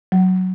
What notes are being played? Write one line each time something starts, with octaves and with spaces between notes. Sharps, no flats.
F#3